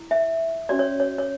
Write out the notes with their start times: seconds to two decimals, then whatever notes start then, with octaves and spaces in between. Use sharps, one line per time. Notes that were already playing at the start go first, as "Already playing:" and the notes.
Already playing: E4
0.11 E5
0.69 C#4 F#4 C#5 D5
0.79 C#5
1.00 C#5
1.18 C#5